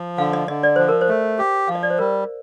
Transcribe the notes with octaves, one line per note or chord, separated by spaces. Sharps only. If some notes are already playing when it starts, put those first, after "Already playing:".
Already playing: F3
D3 F5
D#5
D3 D#5
D5
F3 C5
A#4
C5
A3
G4
F3 F5
D#5
D5
C5
G3 A#4